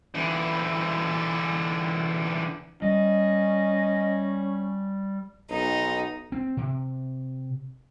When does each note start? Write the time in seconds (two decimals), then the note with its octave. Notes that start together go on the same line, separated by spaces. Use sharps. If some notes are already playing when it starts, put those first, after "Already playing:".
0.15 D3 E3
2.82 G3 C#4 D#5
5.50 B1 D#4
6.32 C4
6.57 C3